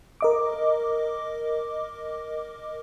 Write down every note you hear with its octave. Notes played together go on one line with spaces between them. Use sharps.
A#4 D#5 D6